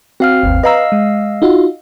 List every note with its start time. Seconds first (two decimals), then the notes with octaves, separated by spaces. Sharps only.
0.20 C4 F#4 F5 F6
0.43 G1 D#2
0.63 B4 D#5 F5 A#5 E6
0.92 G#3
1.42 D#4 F4 F#4